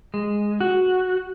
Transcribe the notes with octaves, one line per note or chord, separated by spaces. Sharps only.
G#3
F#4